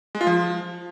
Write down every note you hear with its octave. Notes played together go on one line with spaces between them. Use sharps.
G#3
F4
F3